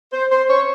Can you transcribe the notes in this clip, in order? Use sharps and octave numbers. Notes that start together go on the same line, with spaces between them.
C5
C5
C#5